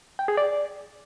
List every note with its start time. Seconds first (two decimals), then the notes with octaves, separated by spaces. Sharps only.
0.19 G5
0.28 G#4
0.37 D5